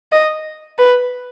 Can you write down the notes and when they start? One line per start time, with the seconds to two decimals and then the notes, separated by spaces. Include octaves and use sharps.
0.12 D#5
0.78 B4